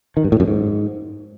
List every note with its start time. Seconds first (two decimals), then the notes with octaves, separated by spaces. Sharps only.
0.17 D#3
0.24 G2
0.32 A2
0.40 F#2
0.48 G#2